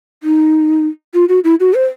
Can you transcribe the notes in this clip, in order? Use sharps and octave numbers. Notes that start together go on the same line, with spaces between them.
D#4
F4
F#4
E4
F#4
C5